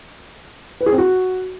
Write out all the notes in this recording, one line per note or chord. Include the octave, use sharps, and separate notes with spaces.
B4
G#4
C4
F#4